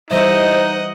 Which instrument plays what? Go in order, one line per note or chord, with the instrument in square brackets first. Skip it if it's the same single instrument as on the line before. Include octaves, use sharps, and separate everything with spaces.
[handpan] E3 G3 E5 [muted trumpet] D#4 [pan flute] C5 [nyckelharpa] D#5 F#5